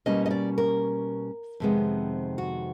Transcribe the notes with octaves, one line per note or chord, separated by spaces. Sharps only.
B2 G3 A#3 C#4 D#5
D#5
D5
A#4
F2 C3 D#3 G#3 B3
F#4